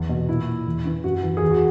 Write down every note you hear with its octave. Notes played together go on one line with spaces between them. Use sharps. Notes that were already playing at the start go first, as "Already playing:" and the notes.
Already playing: E2
B2
A#2 E4
E2
C#3 E3
F#2 F#4
E3
E2 G#4
F#4